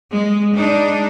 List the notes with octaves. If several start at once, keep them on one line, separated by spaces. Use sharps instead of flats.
G#3
G#3 D4 D#4